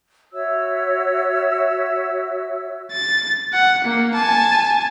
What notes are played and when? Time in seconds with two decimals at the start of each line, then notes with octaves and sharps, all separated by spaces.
0.33 F#4 C#5 E5 E6
2.93 A6
3.53 F#5
3.84 A#3
4.14 G#5 A5